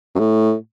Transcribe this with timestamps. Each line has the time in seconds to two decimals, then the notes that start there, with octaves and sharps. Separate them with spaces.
0.15 F#2
0.19 A2